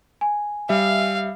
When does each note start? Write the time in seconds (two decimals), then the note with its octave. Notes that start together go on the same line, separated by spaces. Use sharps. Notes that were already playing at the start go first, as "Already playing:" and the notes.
0.21 G#5
0.69 G3 E5 F5